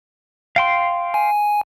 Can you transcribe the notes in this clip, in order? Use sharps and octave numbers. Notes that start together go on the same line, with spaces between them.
F5 G5 C6
G#5